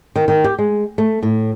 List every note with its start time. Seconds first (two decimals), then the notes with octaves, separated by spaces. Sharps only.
0.16 D#3
0.28 D#3
0.44 G4
0.59 G#3
0.98 A3
1.23 A2